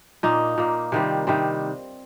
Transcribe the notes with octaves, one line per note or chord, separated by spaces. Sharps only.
A#2 A#3 D#4
A#2 A#3
C3 D#3 G3 C4
C3 D#3 G3 C4